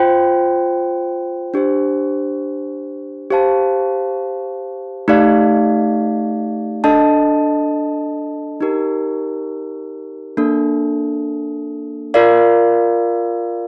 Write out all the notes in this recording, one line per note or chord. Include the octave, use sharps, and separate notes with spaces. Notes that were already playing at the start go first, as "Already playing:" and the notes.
Already playing: F4 C5 G5
D4 G4 C5
G4 C5 F5 A5
A3 D#4 G4 D5 F5
D4 A4 D#5 A5
D#4 G4 A#4
A#3 D4 A4
F4 A#4 D5 F5